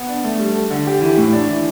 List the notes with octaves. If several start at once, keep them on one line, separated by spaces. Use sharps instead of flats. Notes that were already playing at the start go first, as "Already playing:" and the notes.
Already playing: B3
D4
A3
G3
A4
D3
G4
E3
A2
D4
E3